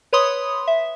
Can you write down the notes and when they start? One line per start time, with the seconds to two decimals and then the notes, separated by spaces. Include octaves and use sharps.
0.13 B4 C#5 B5 C6 D#6
0.67 E5